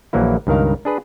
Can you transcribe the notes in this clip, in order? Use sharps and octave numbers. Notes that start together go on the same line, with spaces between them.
A#1 E3 F#3 A#3 E4
C#2 G2 D#3 A#4 F5
D4 G#4 B4